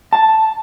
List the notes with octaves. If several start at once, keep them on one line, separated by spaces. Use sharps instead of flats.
A5